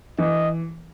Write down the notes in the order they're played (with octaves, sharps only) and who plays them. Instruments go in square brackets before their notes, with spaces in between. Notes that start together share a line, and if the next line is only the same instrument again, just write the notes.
[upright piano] E3 [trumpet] D#5